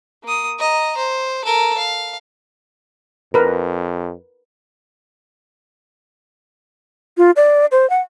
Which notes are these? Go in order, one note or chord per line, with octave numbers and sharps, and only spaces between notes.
A#3 D#6
D#5 A#5
C5
A4 A#4
F5
F2 A#4 B4
F4
D5
C5
F#5